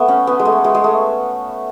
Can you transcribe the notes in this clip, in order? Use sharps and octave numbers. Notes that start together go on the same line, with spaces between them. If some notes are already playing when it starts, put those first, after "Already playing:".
Already playing: A3 B3
C#4
B3
G#3
A3
G#3
G#3
A3